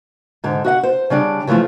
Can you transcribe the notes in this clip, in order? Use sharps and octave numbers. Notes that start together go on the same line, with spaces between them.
G#2 D3
F#4 D#5 F#5
C5
C#3 G3 D4
C#3 E3 F3 A3 F4